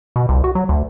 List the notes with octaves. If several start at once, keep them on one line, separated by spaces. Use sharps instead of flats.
B2
C2
F#4
F#3
D2